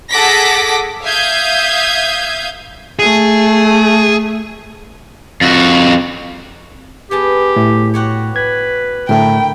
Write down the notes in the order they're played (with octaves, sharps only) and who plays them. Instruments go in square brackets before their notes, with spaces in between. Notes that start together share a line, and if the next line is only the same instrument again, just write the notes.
[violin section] G#4 A4 F#5 D6 A#6 B6
E5 F5 D#6 G6 G#6
[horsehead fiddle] A3 [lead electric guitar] G#4
[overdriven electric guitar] F2 F#4
[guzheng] B3 G#4 A5 [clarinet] G4
[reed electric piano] A2
[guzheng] F#4 G4 C#5
[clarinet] B4 [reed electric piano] G#6
[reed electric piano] A2 D3 A3 [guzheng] E4 A#4 [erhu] G5